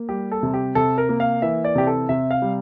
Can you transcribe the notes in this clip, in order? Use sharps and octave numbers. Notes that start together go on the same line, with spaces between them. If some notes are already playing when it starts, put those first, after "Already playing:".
Already playing: A#3
G3 G4
A4
C3
G4
C3 A4
A#4
A#3
F5
E3 E5
D5
C3 G4
A4
C3 E5
F5
G3